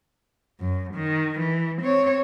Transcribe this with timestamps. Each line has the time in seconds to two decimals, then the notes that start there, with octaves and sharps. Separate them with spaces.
0.60 F#2
0.95 D#3
1.40 E3
1.82 C4 C#5